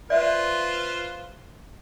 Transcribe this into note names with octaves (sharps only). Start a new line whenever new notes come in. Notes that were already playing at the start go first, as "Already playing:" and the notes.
F4 B4 C5 D5 E5